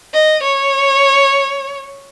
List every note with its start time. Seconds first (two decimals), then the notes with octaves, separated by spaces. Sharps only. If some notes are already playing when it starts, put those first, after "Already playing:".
0.14 D#5
0.43 C#5